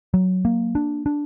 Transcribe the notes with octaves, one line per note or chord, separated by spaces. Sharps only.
F#3
A#3
D4
D4